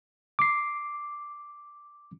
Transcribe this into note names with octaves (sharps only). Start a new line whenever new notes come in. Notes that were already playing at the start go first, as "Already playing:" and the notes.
D6 C7